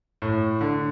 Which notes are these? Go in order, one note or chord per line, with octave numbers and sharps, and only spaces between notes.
A2
D3